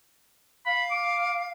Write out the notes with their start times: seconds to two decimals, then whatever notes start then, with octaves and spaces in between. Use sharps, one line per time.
0.66 F5 B5
0.91 D6